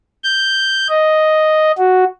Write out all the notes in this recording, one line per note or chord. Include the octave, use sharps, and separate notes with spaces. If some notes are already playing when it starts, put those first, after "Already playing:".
G6
D#5
F#4